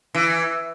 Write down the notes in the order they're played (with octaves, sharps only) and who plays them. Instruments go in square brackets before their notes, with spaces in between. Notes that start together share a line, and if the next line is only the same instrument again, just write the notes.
[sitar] E3